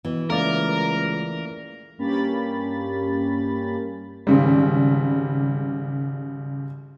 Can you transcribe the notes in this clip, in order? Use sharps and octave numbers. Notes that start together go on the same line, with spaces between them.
B2 E3
C#2 A3 A#3 A#4 D5
G2 A#3 C#4 G4 B5 A6
G#1 C#3 G3